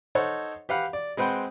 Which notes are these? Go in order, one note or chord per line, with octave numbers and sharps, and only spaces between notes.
D#4 A4 C5 C#5 F#5
G4 B4 F5 F#5
D5
G#3 C4 B4 F#5 G5